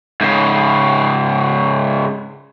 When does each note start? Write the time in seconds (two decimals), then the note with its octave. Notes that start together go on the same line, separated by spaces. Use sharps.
0.21 G#2 C#3